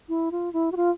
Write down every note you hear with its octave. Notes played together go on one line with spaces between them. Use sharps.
E4
F4
E4
F#4
F4